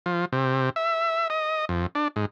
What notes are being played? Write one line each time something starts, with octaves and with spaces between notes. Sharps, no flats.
F3
C3
E5
D#5
F2
D4
G#2